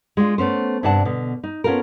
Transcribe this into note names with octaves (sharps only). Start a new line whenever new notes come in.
G#3 D4 F4
A3 B3 C#4 C5
G2 C3 D4 F#5 A5
B2 D3
D#4
B3 C#4 F4 F#4 A4 A#4